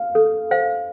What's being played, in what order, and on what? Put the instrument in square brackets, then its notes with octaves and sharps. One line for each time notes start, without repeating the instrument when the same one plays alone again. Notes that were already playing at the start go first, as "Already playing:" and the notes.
Already playing: [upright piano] F5
[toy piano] A4
C5 F5